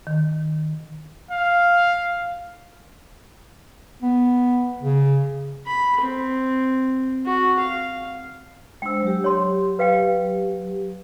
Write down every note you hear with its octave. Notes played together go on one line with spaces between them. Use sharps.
D#3
F5
B3
C#3
B5
C4
F#4
F5
G#3 D4 C5 G5 E6
F#3 G4
C#5 C6
B4 F5 G5